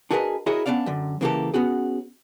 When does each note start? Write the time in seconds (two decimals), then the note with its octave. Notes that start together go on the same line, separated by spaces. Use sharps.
0.11 D4 F#4 G#4 A#4 B4 D#5
0.46 E4 F#4 G#4 A#4 C#5 D#5
0.66 B3 C#4 D4 D5 F5
0.86 F#2 D3
1.21 C#3 E3 A#3 B3 G4 A4
1.54 B3 C#4 F#4 G#4